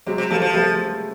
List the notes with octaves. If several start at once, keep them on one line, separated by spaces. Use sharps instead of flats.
C3 F#3 G#3
C3
F3 G3 A3
F3
G3 A3